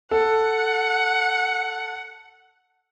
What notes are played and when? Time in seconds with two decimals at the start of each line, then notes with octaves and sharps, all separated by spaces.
0.11 A4 F#5